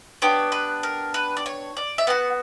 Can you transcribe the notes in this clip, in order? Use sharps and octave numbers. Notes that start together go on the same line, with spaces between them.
B3 D4 G4 C#5
B4
A#4
B4
D5
C#5
D5
E5
B3 F#4 F#5